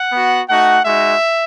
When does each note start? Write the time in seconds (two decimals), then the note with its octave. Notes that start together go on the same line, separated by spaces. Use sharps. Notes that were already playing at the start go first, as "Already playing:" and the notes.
Already playing: F#5
0.12 B3 F#4
0.49 A3 D#4 F#4 F#5
0.85 G#3 D#4 F#4 E5